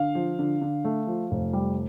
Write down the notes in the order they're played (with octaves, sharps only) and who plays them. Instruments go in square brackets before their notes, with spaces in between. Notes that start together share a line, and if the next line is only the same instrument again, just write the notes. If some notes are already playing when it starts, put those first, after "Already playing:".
Already playing: [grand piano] D3 F5
F3
D3
D3
A3
F3
F1
G3